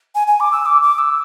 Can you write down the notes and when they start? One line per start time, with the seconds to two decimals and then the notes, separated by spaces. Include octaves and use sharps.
0.15 G#5
0.27 G#5
0.40 D6
0.52 E6
0.66 D6
0.82 D6
0.98 E6